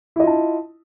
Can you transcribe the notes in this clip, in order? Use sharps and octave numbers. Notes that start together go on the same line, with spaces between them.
E4 F4 D#5 A5